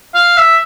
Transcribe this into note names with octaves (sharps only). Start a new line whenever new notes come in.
F5
E5